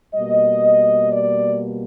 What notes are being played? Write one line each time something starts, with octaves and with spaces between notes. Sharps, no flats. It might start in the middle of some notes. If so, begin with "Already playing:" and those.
B2 G3 A#3 D#5
D5